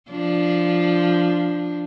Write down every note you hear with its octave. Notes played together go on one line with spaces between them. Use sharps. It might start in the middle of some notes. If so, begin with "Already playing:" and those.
F3 D4